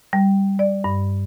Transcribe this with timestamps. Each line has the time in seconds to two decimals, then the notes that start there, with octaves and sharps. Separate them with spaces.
0.13 G3
0.59 D5
0.84 G2